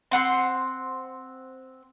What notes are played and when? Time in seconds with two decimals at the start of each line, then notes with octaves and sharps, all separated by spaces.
0.11 C4 F#5 C6